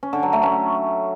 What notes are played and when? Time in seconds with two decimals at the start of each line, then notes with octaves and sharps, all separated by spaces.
0.03 C#4
0.13 D3
0.23 F#3
0.33 A3
0.43 C#4